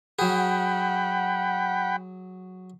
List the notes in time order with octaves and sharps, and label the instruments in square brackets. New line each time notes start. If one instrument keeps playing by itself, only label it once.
[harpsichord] F#3 G#4 [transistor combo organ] F#5 G5 B5